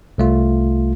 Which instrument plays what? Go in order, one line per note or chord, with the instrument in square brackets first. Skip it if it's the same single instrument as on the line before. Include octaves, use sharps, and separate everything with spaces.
[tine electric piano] C2 A3 F4